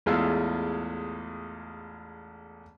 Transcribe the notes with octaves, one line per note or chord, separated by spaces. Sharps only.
A1 E2 G#3 F4 F5 E6